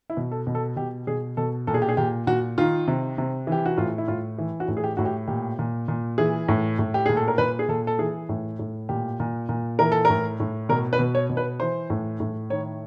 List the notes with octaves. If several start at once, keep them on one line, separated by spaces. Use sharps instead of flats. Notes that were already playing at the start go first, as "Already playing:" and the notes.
E4
B2
A4
B2
A4
B2 G4
B2 G#4
B2 A4
A#2 A4
G#4
G4
G#4
A#2 G4
A#2 F#4
D#3 F4
C3
C3
E3
G4
F#4
A2 F4
E4
A2 F4
E3
F#4
A2
G#4
G4
A2 F#4
G4
A#2 G4
A#2
A#2
E3 G#4
A2
A2
G4
A#2 G#4
A4
A#4
A#2 B4
G#4
A#2 A4
A4
E3 G#4
A2
A2
A#2 G4
A#2
A#2
E3 A#4
A4
A2 A#4
A2
B2 A#4
B4
B2
C#5
B2
B4
E3 C5
A2
A2
D#3 C#5